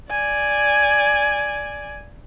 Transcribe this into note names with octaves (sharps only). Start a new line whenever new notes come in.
D5 G#5